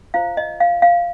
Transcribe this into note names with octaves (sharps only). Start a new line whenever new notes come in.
F4 C5 F5
D#5
F5
F5